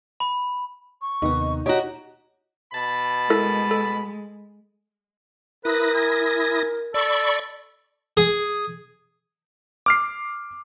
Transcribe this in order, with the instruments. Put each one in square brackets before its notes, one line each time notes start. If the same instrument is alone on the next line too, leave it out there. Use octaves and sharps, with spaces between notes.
[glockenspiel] B5
[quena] C#6
[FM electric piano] D#2 C3 B3 [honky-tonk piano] D#4
[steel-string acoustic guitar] F#4 G4 [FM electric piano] C#5 D#5 A#5
[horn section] B2 A5 B5
[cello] G#3 [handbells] E4 A4 A#4
[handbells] A4
[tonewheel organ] E4 D#6 A#6 [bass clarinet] A#4 [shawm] B4
[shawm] G#5
[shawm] A4 [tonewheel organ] D5 B5 C#6
[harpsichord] G#4
[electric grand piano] D6 F6 C7